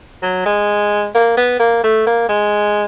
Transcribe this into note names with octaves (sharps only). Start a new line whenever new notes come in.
F#3
G#3
A#3
B3
A#3
A3
A#3
G#3